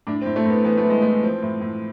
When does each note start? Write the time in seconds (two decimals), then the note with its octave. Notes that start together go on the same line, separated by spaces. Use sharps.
0.07 A2 D4
0.21 C4
0.26 A2
0.36 A3
0.45 A2 B3
0.64 E3 B3
0.77 A3
0.84 E3
0.90 G#3
1.02 E3 A3
1.23 F3 C4
1.42 A2
1.61 A2